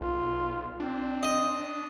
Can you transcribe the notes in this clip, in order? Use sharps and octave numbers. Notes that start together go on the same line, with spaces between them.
B1 F4
C4 D4
D#5